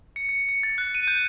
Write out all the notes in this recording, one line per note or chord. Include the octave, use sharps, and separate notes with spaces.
C#7
C#7
C#7
A6
F#6
D#7
G6